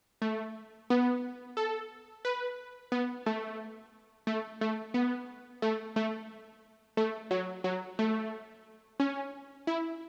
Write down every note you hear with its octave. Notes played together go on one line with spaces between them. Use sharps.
A3
B3
A4
B4
B3
A3
A3
A3
B3
A3
A3
A3
F#3
F#3
A3
C#4
E4